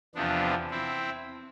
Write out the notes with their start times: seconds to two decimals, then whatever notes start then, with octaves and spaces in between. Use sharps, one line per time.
0.15 E2 C3 F3 B3 D4
0.71 C4 E4